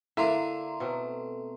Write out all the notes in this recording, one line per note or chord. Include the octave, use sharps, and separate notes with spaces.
D3 A#3 E4 A4 E5 A#5 C6
B2 A3 C4